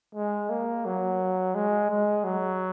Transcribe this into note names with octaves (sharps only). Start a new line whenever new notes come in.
G#3
A#3
F#3
G#3
G#3
F#3